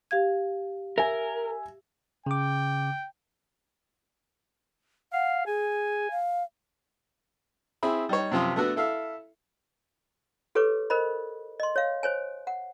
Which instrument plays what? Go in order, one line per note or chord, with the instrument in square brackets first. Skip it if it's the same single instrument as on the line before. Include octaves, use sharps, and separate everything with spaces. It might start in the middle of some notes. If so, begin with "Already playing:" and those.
[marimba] G4 F5 G#6
[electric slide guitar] A#4 [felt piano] E5 G#5
[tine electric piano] C#3 D6 [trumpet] G5
[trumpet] F5 [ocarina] F#5
[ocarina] G#4 [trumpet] G#5
[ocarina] F5
[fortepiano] C4 E4 G#4 B5
G3 D#4 C#5
F#2 C3 F3 F4 D#6
A3 B3 D4 F#4 A4
E4 A4 E5 F5
[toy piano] G4 A4 B4 C#5 D6
A#4 C5 D#5 B5
D#5 C6
C#5 F5
C5 C#5 G#5
F#5